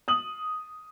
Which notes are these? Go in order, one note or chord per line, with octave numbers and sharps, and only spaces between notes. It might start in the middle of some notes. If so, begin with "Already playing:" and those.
D#6 F#7